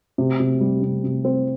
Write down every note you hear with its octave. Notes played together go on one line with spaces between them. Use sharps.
C3
C3
G3
C3
C3
C4